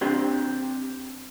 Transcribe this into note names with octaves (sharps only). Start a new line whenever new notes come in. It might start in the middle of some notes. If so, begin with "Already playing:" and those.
C4 D4 G4 C6